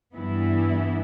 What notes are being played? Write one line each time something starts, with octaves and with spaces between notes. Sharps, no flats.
G2 E3 B3 E4